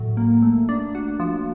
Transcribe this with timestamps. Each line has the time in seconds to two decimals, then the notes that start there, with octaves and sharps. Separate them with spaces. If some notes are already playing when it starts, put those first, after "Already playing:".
Already playing: A2 F#3
0.17 A#3
0.42 A3
0.69 D4
0.95 F#4
1.20 F3